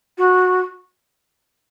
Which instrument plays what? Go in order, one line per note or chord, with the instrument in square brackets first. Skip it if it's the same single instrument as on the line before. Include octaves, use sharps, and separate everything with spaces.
[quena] F#4